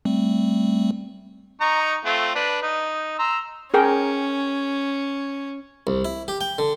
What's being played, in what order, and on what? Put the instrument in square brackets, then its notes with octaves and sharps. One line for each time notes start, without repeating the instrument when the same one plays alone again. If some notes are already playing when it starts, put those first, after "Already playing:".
[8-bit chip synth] G3 A3 C4
[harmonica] D#4 A#5 C#6
A3 C4 F4
D4 B4
D#4
A#5 C6 E6
[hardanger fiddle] C#4 [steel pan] G#4 A#4 G5
[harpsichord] C2
E4
G4
G5
D3